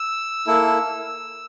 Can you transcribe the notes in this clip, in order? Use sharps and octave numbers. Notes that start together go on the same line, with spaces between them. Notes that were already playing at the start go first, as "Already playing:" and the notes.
Already playing: E6
A#3 E4 A4